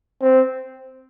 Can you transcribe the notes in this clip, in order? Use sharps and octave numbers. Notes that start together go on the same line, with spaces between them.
C4